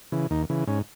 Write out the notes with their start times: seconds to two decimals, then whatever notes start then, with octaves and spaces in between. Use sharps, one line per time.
0.12 C#3 E3
0.30 D#2 D#4
0.50 C#3 E3
0.67 G#2 C#4